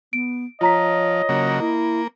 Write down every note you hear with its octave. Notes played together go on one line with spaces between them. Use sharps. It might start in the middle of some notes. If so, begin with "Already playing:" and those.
B3 D7
F3 F4 C#5 D#5 A#5 B6
C#3 F#3 A#3
A#3 E4